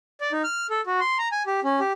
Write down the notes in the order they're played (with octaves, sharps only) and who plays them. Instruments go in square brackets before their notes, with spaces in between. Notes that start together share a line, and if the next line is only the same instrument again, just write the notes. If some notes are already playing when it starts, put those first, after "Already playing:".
[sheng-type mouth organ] D5
D#4
F6
A4
F#4
C6
A#5
G#5
G4
C#4
G4